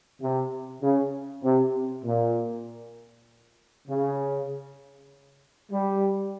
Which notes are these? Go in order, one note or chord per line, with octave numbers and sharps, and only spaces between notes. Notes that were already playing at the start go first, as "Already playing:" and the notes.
C3
C#3
C3
A#2
C#3
G3